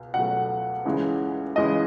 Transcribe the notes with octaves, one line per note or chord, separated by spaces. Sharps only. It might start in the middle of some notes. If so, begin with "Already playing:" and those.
Already playing: C#2 B2
C#2 B2 F#3 A3 F#5
C#2 C#3 E3 G#3
C#2 C#3 E3 G#3 D#5